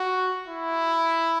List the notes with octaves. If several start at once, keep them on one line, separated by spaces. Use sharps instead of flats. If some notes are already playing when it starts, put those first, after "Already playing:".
Already playing: F#4
E4